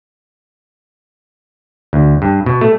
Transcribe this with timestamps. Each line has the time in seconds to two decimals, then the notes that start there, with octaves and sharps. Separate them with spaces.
1.93 D2
2.22 G2
2.46 B2
2.61 A3